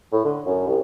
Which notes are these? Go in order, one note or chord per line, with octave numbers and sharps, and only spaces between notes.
A2
D3
F#2
C2